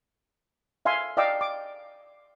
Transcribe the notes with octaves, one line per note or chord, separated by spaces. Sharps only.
E5 F5 G#5 C6
D5 D#5 F5 G5 D6 E6
D6